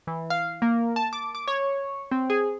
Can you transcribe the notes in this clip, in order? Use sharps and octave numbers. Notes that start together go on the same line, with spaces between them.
E3
F5
A#3
A5
D6
D6
C#5
C4
G#4